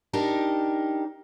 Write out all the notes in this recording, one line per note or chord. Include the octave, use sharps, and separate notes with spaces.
D4 D#4 G4 A#4